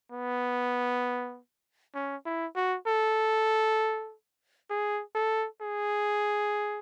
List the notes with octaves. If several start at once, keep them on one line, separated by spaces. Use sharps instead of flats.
B3
C#4
E4
F#4
A4
G#4
A4
G#4